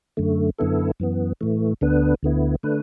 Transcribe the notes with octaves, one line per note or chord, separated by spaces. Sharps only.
F#2 D3 A3
F#2 D3 B3 E4 A4
F#2 E3 B3
A2 E3 A3
D2 D3 B3 D4 B4
D2 D3 B3 E4
D3 A3 D4 B4